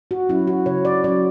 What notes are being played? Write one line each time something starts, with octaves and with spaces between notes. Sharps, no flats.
F#4
F#3 C#4 E4
F#4
C#3 C#5
D5
F#3 C#4 D5